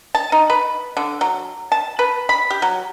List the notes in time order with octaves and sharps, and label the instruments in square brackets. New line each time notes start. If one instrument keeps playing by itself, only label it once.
[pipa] A5
D#4
B4
D3
F#3
A5
B4
B5
G4
F#3